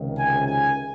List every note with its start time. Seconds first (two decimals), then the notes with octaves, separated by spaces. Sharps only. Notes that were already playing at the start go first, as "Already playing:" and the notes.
Already playing: C#2 C3 D#3
0.18 G#5
0.47 G#5